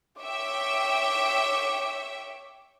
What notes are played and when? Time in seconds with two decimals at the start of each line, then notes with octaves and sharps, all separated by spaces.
0.22 C#5 E5 G5 D6